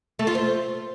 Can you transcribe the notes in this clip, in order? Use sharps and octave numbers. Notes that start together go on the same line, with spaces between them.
A3
F4
C5